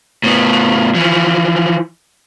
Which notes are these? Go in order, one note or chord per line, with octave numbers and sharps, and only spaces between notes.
A2 B3
E3 F3